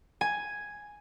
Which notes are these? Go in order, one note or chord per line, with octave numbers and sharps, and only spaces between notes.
G#5